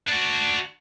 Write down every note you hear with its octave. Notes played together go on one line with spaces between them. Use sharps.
D4 F#4